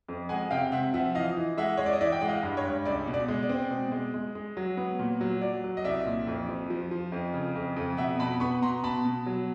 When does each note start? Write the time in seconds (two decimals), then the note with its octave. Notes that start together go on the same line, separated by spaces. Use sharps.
0.08 F2
0.29 G#3 F#5 G#5
0.51 C3 F5 G5
0.72 C3 E5 F#5
0.94 F3 E5 F#5
1.15 E3 D#5 F5
1.37 E3
1.57 G#3 E5 F#5
1.77 G#3 C#5
1.86 D5
1.93 D#5
2.00 E3 D5 E5
2.12 G5
2.21 G#3 F#5
2.28 D#5 F5
2.43 G2
2.57 C#5
2.65 G2
2.85 C#2 D5
3.07 B2
3.14 D5
3.28 G#3
3.43 D5
3.49 C4
3.71 B2
3.92 G#3
4.14 G#3
4.35 G#3
4.57 F#3
4.77 B3
4.99 A#2
5.21 F#3
5.41 F#3 D5
5.64 F#3
5.77 D#5
5.84 C2 D5 E5
6.06 A#2
6.27 F2
6.48 F3
6.70 F3
6.91 F3
7.12 F2
7.34 C#3
7.55 F2
7.76 F2
7.97 B2 E5 F#5
8.19 B2 A5 B5
8.40 B3 B5 C#6
8.62 B2 A#5 C6
8.83 B2 A5 B5
9.05 B2
9.26 F#3